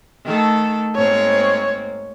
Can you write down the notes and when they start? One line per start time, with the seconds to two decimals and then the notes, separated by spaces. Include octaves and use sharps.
0.25 D#3 A3 A4
0.96 G#2 A#3 C4 C#5